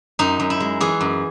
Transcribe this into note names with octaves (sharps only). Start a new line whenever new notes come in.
F#2 D#4
F#2
E4
G#3
E3 G#4
F#2